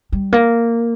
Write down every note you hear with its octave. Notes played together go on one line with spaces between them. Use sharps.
G3
A#3